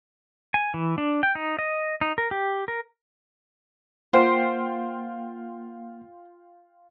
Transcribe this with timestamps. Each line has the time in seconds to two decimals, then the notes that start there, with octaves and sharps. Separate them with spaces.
0.54 G#5
0.74 E3
0.98 D4
1.23 G5
1.35 D#4
1.59 D#5
2.01 D#4
2.18 A#4
2.31 G4
2.68 A#4
4.13 A#3 F4 C5 F#5 G5 C6